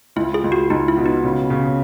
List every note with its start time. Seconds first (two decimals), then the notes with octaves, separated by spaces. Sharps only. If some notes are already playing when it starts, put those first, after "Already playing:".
0.16 C#2 E4
0.34 G#4
0.44 C#2
0.52 F#4
0.70 C#2 D#4
0.88 E4
0.97 B2
1.06 D#4
1.24 C#3
1.50 C#3